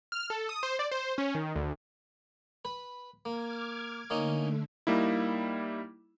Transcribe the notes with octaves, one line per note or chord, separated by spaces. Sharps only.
F6
A4
D#6
C5
D5
C5
C#4
D#3
D2
B4
A#3 D6 F6 G#6
D3 A3 A#3 C#4 D#4
G3 A#3 D#4 E4